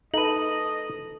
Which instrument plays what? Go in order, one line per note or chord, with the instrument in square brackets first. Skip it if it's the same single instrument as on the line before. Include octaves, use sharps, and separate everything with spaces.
[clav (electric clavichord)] D#4 B4 [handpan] A4 [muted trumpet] D#5 [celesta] D#7 F#7